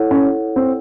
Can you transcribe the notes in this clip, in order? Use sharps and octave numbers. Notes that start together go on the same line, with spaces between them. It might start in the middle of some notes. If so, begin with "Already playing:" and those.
Already playing: E4 A4 C#5 F#5
C#4
C4